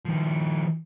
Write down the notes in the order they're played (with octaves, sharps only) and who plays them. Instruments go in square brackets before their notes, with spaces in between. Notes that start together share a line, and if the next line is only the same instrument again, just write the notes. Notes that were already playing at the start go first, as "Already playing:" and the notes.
[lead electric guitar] D#3 F3